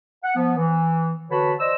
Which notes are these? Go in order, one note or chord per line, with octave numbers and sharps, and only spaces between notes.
F#5
F3 B3
E3
D3 F#4 B4 C#5 A5 B5
C5 D5 D#5 E6